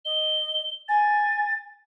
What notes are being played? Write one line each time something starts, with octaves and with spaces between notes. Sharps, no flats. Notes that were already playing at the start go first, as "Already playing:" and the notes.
D#5 G7
G#5 A6